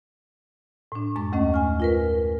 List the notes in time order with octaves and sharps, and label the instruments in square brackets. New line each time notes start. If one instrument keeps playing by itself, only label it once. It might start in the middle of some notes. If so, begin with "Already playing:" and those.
[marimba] A2 D4
F#2 G#3 C#6
D#2 A3 C#4 D#5 F#5
G#5 F6
F4 A#4 B4